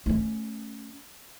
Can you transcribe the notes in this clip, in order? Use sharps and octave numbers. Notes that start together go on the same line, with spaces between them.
A3 C#4